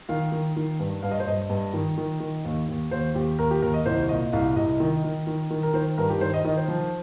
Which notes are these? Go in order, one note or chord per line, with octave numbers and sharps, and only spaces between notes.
D#3 F5
D#3
D#3
G2
G2 F5
D#5
C5
G2 D#5
G2
D#3
D#3
D#3
D#2
D#2
D#2 C5
D#2 G4
D#2 A#4
G4
D#2 A#4
D#5
C2 C5
A#2 D#5
C2 F5
C2 D#5
D#3 D#5
D#3
D#3
D#3
A#4
D#3 C5
G2 A#4
G4
D#3 C5
D#5
D#3 D#5
C5
F3